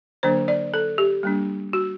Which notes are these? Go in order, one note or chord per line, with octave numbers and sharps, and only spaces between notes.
D3 F#3 A#3 D4 C5
D5
A4
G4
G3 A#3 D4
F#4